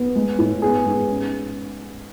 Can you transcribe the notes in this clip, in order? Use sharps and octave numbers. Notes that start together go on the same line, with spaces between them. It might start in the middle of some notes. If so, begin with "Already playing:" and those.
Already playing: B3
G#3
A2
B3 G#4
G#2
C#4